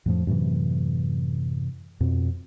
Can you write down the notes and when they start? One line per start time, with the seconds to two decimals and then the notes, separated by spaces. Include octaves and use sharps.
0.06 F2 A2 F3
0.27 F#2 A2 C3 E3
2.00 F2 B2